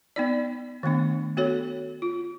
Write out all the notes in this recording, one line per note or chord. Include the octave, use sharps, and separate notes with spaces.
B3 D#4 D5
D#3 A3 B3 D4
B3 F#4 A4 C#5
F4